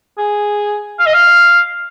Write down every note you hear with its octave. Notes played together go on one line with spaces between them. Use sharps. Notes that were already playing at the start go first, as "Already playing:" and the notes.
G#4
F5
D#5
F5